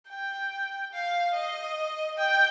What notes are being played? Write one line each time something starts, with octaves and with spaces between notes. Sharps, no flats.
G5
F5
D#5
G5